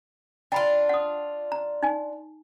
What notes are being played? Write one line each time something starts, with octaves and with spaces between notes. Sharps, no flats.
D4 F4 G5 A#5 B5
F#5 D#6
A#5
D#4 G#5